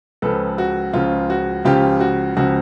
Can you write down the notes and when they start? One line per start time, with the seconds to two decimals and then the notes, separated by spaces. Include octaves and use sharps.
0.22 C#2 C#3 F3 A4 B4
0.58 F#4
0.93 C#2 C#3 F3 F4
1.30 F#4
1.65 C#2 C#3 F3 F4 G4
2.00 F#4
2.36 C#2 C#3 F3 F#4